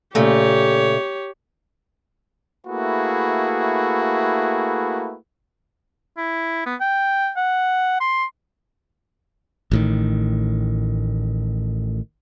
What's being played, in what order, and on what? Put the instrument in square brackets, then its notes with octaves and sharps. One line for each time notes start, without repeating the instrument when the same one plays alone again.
[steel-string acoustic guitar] A#2 C#3 A3 [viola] G4 C#5
[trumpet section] A3 A#3 E4 F#4 G#4 B4
[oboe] E4
B3
G5
F#5
C6
[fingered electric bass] A1 A2 D#3